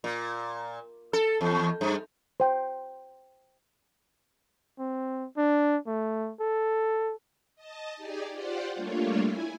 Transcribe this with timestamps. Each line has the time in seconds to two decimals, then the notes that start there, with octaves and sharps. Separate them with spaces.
0.04 A#2
1.13 A4
1.41 E2
1.81 G2
2.40 C5 G5
4.79 C4
5.37 D4
5.87 A3
6.40 A4
7.56 D#5 A5
7.96 D#4 G4 G#4 D5 G#5
8.31 F4 G4 C5 D5 F#5
8.75 G3 A3 A#3 D4 F4 C#5
9.20 E4 G#5